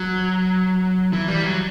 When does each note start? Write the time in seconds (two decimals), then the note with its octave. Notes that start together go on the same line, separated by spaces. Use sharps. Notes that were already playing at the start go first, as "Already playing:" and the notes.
Already playing: F#3
1.13 E3
1.28 G3
1.43 F#3